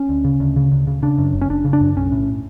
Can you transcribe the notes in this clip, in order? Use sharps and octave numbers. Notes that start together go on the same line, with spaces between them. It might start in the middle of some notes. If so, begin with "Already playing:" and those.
Already playing: C#4
D2
C#3
D2
C#3
D2
C#3
C#3 D4
F#2
F#1
C#4
F#1 D4
C#3
D4
F#2
B1 C#4
A2